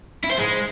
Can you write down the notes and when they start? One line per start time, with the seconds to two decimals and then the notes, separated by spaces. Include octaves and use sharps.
0.24 E4
0.31 C5
0.38 G#3